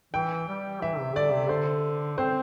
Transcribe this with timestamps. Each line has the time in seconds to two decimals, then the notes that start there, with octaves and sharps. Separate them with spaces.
0.14 E3 G5
0.48 G3
0.81 E3 E5
0.99 C3
1.16 D3 D5
1.32 C3
1.49 D3 C5
2.18 C4 C5